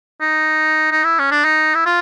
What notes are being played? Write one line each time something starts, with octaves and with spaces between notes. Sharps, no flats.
D#4
D#4
E4
C#4
D4
D#4
E4
F4